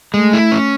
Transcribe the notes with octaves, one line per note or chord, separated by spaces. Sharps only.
G#3 A3
E4
C#4